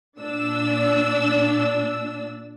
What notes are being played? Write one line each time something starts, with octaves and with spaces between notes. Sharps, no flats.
A#2 D4 D5 E6